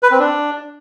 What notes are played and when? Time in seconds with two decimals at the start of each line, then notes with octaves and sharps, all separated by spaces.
0.03 B4
0.11 C4
0.19 D4